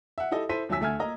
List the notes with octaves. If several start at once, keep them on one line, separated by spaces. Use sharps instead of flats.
E5 F#5
E4 G4 A4 D#5
E4 A4 C5 B6 D#7
D#2 F#3 E5 G#5 E6 B6
D2 A3 E5 G#5 F6 G#6
A#3 D#5 A#5